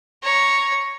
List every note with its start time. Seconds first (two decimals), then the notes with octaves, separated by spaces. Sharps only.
0.23 C#5 A#5